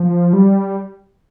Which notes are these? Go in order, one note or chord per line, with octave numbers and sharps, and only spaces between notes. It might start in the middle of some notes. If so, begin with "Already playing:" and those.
Already playing: F3
G3